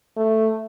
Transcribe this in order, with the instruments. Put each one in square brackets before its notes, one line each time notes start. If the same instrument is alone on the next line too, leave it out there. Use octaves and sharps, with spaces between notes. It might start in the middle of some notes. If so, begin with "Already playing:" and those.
[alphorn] A3